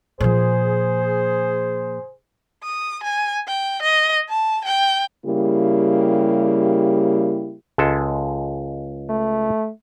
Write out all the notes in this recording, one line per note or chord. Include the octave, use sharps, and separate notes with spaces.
A#2 F3 G#4 C5
D#6
G#5
G5
D#5
A5
G5
C#3 G3 A#3 E4 G4
C#2 G#3 A4
A3